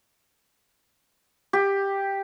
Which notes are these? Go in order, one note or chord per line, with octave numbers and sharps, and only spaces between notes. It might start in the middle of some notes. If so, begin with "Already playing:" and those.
G4